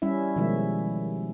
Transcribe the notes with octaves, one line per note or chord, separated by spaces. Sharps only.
G3 C#4 E4 E5
B2 D#3 F3 G#3 E5